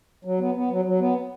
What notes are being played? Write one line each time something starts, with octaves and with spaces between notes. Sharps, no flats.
F#3
B3
B3
F#3
F#3
B3